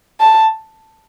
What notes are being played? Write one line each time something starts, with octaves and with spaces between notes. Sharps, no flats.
A5